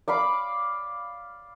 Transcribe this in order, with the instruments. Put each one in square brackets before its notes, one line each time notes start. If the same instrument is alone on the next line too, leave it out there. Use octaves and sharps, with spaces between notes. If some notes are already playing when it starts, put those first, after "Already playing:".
[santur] D5 F5 B5 D6